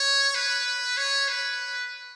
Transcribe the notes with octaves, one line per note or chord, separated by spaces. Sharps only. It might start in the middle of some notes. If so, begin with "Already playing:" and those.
Already playing: C#5
B4
C#5
B4